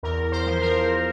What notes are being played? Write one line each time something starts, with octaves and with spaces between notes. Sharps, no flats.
E2 A#4
C5
F3
A#4